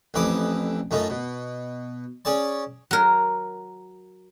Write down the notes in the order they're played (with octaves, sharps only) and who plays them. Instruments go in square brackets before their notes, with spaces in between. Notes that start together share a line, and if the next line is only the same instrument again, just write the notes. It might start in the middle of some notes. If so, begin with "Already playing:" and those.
[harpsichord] A1 F2 E3 E5 D6 D#6
F#2 A3 D#4 F4
B2
C#4 G#4 D5 A5
[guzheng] F#3 A#4